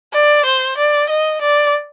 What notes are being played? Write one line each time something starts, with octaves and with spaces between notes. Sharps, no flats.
D5
C5
D5
D#5
D5